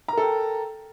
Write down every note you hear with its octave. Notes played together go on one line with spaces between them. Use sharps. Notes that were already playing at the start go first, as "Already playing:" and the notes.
A4 A#4 G5 A#5